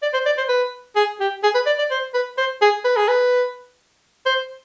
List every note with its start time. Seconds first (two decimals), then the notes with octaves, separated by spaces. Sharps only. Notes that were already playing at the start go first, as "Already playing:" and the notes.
0.02 D5
0.13 C5
0.26 D5
0.38 C5
0.48 B4
0.96 G#4
1.20 G4
1.43 G#4
1.55 B4
1.66 D5
1.78 D5
1.91 C5
2.14 B4
2.38 C5
2.62 G#4
2.84 B4
2.97 G#4
3.08 B4
4.26 C5